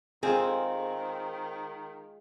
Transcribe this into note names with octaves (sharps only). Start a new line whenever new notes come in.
D#3 G#3 C4 F4 G#4